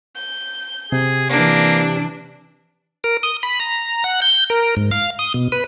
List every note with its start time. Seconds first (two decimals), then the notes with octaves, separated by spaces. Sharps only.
0.17 G6
0.92 C3 G#4
1.30 E3 A#3 D4
3.04 A#4
3.23 D#6
3.43 B5
3.60 A#5
4.04 F#5
4.22 G6
4.50 A#4
4.77 G#2
4.91 F5
5.19 D#6
5.34 B2
5.52 B4